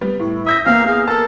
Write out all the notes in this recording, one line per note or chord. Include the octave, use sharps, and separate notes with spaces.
G3 B3
A2 E4
E5 D#6 G6 A#6
E2 A#3 F5
G#4 F5
A4 A#4 A5